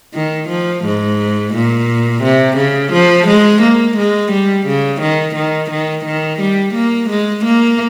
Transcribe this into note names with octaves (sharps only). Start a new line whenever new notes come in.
D#3
F3
G#2
A#2
C3
C#3
F3
G#3
A#3
G#3
G3
C#3
D#3
D#3
D#3
D#3
G3
A#3
G#3
A#3